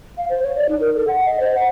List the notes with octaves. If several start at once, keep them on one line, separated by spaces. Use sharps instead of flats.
F5
C5
C#5
D5
D#4
A#4
A4
F#5
D#5
C5
F#5